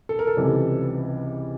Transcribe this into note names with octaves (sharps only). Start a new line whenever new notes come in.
A4
A#4
A4
C#2 C3 E3 G3